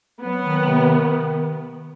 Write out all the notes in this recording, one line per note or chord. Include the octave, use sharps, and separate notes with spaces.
F#3 B3
D#3
C3
D#3